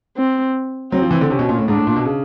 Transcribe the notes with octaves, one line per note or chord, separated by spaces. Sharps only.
C4
F#3 C4
F3
E3
D3
C3 C#4
B2
A#2
A2
G#2 D4
A2
A#2
B2
C#3